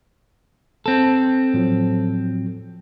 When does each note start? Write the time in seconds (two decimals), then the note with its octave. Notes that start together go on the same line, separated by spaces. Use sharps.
0.86 C4 A4
1.54 A2 F3 F#3